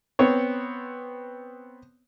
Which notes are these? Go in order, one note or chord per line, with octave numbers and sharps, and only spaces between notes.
B3 C4 C#5